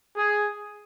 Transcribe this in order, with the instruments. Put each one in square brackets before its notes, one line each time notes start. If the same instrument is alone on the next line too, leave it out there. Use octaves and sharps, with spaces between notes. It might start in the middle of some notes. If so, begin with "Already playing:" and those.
[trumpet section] G#4